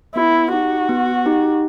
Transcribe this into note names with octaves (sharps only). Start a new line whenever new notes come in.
B3 E4
D#4 F#4 G4
B3
D#4 G4